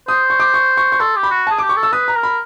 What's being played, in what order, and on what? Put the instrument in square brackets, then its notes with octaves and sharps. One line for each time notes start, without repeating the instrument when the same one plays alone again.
[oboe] C5 [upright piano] D#6
[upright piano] C#6
D6
C#6
C#6
C#6
[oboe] A4 [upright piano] C6
[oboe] G4
[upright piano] B5
[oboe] F#4
[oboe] G#4 [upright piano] A5
[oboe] G4 [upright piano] D6
[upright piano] C#6
[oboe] A4
[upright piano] E6
[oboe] B4 [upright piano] D#6
[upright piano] A#5
[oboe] A#4
[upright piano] B5